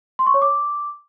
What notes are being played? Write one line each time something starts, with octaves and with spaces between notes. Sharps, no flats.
C6
C#6
C#5
D6